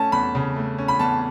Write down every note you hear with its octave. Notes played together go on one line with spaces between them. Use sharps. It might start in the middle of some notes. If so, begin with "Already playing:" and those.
Already playing: A3 C#4 A5
E2 B5
C#3
A3
C#4
B5
E2 A5